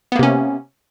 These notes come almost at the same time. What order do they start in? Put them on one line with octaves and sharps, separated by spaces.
B3 A#3 C3 C#4